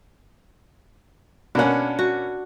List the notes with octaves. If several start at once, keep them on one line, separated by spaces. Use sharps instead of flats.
B2 A#3 C#4 D4 F#5
F#4